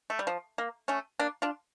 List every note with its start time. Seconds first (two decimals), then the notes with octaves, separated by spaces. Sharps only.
0.10 A3
0.19 G3
0.27 F3
0.58 A#3
0.88 A3 C#4
1.19 A#3 D4
1.42 D4 F4